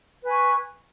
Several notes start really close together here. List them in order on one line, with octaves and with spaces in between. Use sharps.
B4 G#5 C#6